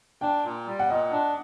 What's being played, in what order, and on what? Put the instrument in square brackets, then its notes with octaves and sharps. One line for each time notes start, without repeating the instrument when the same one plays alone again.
[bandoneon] D4 [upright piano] G5
[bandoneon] A#2
G3
[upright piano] F#5
[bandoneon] A#2 [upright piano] D#5
[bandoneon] D4